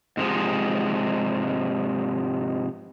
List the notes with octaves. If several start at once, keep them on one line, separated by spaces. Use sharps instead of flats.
G#2 C3 F3 G#3